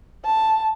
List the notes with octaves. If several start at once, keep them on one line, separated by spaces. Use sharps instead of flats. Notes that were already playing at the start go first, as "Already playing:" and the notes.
A5